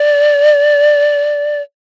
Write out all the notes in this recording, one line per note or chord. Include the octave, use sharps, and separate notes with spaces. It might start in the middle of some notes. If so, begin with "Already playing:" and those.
Already playing: D5